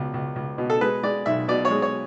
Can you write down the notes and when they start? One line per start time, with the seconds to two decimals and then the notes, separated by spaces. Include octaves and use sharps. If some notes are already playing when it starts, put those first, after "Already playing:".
Already playing: C#2 B2
0.14 C#2
0.36 C#2
0.58 B2
0.70 A4
0.81 G#3 B4
1.03 G#3 D5
1.26 B1 E5
1.48 B2 D5
1.65 C#5
1.71 G#3
1.82 C#5